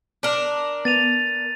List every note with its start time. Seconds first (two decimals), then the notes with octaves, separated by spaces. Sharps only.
0.23 D4 A#4
0.85 B3 A6 D#7 F7